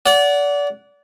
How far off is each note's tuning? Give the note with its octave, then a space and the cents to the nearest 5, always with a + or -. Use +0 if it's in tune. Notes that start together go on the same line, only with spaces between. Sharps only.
D5 -30 F#5 +0